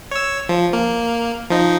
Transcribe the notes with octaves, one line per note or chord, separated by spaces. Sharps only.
C#5 E6
F3
A#3
F3 D#4